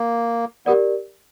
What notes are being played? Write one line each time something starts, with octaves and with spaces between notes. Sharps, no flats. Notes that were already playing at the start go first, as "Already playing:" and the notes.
Already playing: A#3
B3 G4 A#4 D5